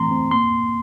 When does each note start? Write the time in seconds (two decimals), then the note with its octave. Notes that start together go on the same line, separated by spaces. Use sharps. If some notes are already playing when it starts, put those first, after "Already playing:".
Already playing: E3 A3 C4 A#5 C6
0.11 C4
0.31 A#3 C6